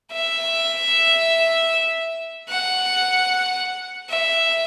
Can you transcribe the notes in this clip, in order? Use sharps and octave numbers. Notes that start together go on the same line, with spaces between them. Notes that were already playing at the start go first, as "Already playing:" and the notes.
E5
F#5
E5